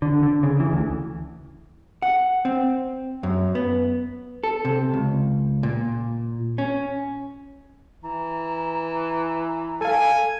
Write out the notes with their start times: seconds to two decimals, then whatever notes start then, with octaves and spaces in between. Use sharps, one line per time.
0.02 D3
0.23 D3
0.43 C#3
0.60 E3
0.73 D2
2.02 F#5
2.45 C4
3.23 F#2
3.55 B3
4.44 A4
4.65 C3
4.94 C#2
5.63 A#2
6.58 C#4
8.03 E3 A#5
9.81 A4 F5 G#5